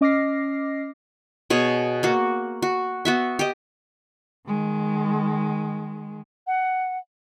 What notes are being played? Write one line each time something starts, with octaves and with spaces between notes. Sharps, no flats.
C#4 D#5 D6 F6 A#6 C7
B2 G#4 C#5
A#3 F#4
F#4
B3 F#4 E5
G4 D#5
D#3 G#3
F#5